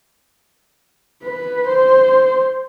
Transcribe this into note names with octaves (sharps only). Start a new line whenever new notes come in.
B4
C5